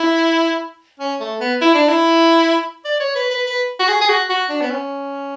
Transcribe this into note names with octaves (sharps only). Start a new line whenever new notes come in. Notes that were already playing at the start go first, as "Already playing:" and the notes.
Already playing: E4
C#4
A3
B3
E4
D4
E4
D5
C#5
B4
B4
B4
F#4
G#4
G#4
F#4
F#4
D4
B3
C#4